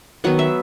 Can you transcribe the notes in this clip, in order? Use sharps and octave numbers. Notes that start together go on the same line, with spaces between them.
D#3 F#3 B3 F#5
E5